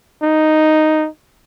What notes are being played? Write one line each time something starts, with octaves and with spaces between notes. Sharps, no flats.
D#4